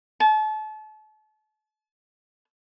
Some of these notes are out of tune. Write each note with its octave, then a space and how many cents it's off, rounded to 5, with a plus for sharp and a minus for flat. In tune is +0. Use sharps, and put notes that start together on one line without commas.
A5 -35